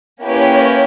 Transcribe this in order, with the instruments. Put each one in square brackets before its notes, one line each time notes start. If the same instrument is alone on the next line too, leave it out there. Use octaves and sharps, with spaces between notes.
[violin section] A#3 C#4 E4 G4 B4 [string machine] C#5